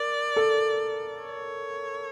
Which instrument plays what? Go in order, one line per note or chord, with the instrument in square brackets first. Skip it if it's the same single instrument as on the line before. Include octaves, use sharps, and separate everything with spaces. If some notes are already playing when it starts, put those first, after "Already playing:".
Already playing: [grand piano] A#4 [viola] D5
[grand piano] A4
[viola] C#5